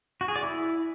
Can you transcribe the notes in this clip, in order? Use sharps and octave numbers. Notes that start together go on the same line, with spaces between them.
F#4
G#4
D5
E4